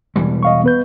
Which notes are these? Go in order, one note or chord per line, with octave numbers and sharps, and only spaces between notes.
E1 E3 G3
D#5 F5 C#6
B3 B4 G6